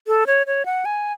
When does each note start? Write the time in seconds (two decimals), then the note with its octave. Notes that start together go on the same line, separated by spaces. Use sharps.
0.07 A4
0.27 C#5
0.47 C#5
0.66 F#5
0.85 G#5